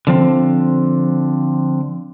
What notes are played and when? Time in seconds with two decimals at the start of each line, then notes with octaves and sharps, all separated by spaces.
0.07 D3 F3 C4